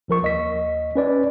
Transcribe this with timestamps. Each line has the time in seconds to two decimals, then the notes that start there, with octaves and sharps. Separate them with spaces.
0.08 C2 F3 A#4 C#6
0.22 D#2 D#5 B6
0.95 C#4 B4 D5